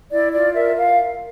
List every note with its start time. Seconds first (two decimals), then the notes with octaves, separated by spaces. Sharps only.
0.11 E4 D5
0.33 F4 D5
0.54 A#4 E5
0.77 A#4 F5